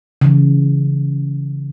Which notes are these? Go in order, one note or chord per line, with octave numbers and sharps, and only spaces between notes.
C#3 E3